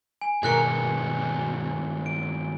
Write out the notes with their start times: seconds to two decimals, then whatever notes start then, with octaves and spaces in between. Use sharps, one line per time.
0.21 G#5
0.43 G2 B2 D#3 G#4 A#4 G#5 F#6 C#7
2.06 D7